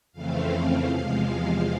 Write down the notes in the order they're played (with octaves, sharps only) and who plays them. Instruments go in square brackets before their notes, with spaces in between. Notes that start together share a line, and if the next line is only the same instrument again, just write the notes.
[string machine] F2 C#3 E3 A3 C4 F5
E2 C3 F3 G#3